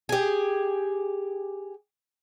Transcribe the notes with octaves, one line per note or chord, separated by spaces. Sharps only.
G4 G#4